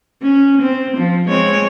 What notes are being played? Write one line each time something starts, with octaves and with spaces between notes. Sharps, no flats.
C#4
C4
F3
G#3 C4 C#5